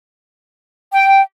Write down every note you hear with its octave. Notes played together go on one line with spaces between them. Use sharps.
G5